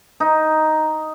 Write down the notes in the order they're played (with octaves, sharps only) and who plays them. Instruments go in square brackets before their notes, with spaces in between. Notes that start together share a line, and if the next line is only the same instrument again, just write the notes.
[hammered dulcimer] D#4